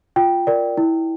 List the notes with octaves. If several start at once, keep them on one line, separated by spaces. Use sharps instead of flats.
F4 G5
A#4 D5
E4